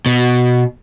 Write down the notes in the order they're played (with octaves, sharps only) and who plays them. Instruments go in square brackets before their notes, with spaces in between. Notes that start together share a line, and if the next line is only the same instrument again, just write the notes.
[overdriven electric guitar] B2